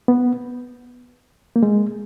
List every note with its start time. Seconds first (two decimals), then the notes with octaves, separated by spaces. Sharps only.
0.08 B3
1.56 A#3
1.63 G#3